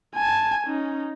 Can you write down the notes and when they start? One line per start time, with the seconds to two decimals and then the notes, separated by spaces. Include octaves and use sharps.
0.15 G#5 A5
0.67 C#4 D#4